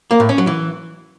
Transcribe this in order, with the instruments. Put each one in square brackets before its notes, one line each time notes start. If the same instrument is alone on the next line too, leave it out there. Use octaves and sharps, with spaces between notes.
[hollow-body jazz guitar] A#3
A2
C#4
F#3
E3